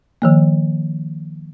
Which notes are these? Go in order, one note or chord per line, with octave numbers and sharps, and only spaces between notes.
D#3 F3 A#3